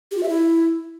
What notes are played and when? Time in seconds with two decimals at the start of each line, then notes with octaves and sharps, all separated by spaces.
0.11 G4
0.17 F4
0.23 E5
0.29 E4